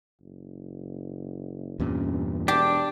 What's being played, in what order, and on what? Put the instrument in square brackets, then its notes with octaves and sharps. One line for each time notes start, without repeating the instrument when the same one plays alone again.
[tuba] F#1
[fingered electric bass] E2 G2 A#2 [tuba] C#4
[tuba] E1 [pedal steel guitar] D4 [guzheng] G4